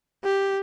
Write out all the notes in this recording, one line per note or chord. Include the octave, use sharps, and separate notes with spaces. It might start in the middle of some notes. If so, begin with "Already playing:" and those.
G4